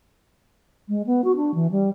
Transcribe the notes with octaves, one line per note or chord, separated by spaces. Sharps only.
G#3
B3
F#4
D4
E3
G3